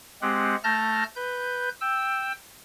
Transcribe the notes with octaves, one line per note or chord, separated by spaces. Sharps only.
G#3 C4 G4 F#5
A3 A5 F6 G6 A#6
B4 G6
G5 E6